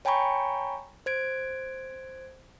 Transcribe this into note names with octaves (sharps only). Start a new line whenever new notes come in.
C#5 G5 G#5 A#5 B5 C#6
C5 G#6 D7